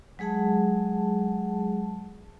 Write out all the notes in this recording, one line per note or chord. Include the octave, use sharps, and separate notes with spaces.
F#3 G#3 G#4 F#5 A5